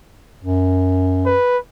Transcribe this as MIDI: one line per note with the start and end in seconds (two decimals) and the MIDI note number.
0.43 1.36 42
1.26 1.58 71